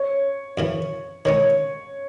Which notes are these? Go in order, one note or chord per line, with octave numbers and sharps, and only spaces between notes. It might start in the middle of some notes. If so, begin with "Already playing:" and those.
Already playing: C#5
F#2 C#3 E3
D#3 G#3 C#4 C#5